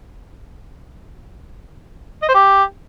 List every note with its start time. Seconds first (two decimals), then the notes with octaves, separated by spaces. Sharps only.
2.22 D#5
2.28 C5
2.34 G4